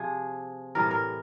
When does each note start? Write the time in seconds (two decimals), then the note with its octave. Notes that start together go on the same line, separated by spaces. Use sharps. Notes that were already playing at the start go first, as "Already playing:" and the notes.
Already playing: C3 F3 G#4
0.75 A2 E3 G3 A#4
0.91 A#4